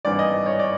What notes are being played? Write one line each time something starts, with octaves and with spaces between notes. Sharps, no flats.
G#1 G2 E3 D5
D#5
C#5
D5